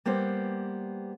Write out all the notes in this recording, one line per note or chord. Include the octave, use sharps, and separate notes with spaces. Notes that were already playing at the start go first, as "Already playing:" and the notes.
G3 A#3 B3 G4 C5